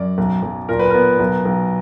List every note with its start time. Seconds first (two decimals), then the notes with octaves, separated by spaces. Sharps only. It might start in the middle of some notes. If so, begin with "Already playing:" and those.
Already playing: F#2 D5
0.18 B1
0.43 B1
0.69 A#2 A#4
0.79 B4
0.90 B3 A#4
1.20 B1
1.45 B1